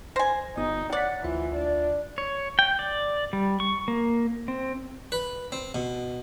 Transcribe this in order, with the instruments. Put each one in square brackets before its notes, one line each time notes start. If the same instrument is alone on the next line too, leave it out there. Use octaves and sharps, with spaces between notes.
[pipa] C5 G#5 [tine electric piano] A#6
[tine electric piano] G1 B3 D#6 [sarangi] D#4
[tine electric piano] C#5 A6 B6 [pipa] D5 [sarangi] F#5
[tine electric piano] D2 F4 E5 [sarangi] E3
[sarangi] D4
[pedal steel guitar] C#5
G5
D5
G3
C#6
A#3
C4
[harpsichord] B4
C4
B2